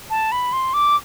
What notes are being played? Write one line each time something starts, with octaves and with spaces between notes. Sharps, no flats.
A5
B5
C6
D6